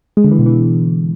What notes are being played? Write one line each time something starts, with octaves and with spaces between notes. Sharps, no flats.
G#3
D3
E3
B2
E3